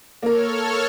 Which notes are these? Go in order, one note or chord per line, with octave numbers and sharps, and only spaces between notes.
A#3 A4 A#4 C#5 F6